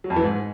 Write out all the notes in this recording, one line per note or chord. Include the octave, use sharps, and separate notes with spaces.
F#3
F2
E3
G#2